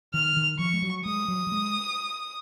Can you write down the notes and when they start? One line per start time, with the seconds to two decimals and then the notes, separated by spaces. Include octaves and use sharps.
0.13 D#3 F6
0.37 D#3
0.59 F3 C#6
0.73 G#3
0.82 F#3
1.05 G#3 D#6
1.28 F#3
1.47 F#3
1.52 G#3